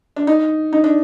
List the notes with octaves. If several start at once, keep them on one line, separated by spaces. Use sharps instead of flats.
D4
D#4
D#4
D4